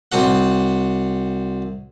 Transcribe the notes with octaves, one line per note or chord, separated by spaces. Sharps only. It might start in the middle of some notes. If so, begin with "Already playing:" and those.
C2 C4 F#4 F#5